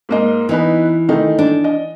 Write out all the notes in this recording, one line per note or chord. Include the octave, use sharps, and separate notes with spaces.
G#2 A#3 D#5
E3 B3 D#4 B4
D#3 A3 D#4
D4
D#5